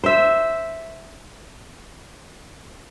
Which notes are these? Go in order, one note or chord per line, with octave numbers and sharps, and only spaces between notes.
C5 E5